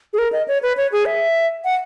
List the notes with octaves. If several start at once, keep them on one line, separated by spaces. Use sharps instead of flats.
G#4
A#4
D#5
C#5
B4
C#5
G#4
E5
F#5